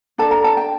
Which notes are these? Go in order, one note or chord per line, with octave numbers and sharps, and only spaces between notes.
D4 A4 A5
A#5
A5
G5